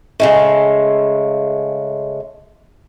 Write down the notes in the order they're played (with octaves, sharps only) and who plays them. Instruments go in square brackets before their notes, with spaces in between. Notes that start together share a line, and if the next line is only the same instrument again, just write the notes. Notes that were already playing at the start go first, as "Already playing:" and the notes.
[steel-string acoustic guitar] C#3 G#3 A3